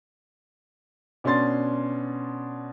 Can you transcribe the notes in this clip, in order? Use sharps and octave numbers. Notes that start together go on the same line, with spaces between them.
B2 C#4 D4 C6 A6